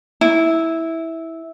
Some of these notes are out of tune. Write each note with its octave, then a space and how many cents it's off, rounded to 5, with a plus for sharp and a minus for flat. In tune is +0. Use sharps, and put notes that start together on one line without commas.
E4 -10